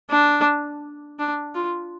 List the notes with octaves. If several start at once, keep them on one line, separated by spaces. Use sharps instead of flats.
D4
D4
F4